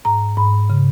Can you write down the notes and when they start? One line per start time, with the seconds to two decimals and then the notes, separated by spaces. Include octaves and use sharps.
0.05 G#2 A#5
0.37 G#2 B5
0.70 C#3